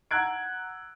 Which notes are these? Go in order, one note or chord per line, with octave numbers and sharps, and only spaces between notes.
F#5 A#5 E6 F#6 G#6 D7